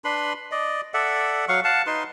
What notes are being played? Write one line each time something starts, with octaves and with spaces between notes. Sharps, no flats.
D4 B4 B5 C6
D5 D#5
A4 D5 E5 F#5
F#3 F5 F#5 C#6
F5 F#5 A5
D#4 B4 C6